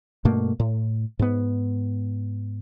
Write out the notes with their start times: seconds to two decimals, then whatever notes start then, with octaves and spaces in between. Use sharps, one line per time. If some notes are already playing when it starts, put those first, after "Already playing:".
0.25 G2 B2 A3 A#3
0.60 A2
1.19 G#2 B3